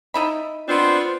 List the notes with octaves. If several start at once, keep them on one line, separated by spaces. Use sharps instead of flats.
D#4 E4 B5
B3 C4 D4 F4 C5